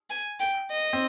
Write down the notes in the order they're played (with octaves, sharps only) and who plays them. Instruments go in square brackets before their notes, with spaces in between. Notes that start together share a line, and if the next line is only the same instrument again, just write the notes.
[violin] G#5
G5
D#5
[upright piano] C4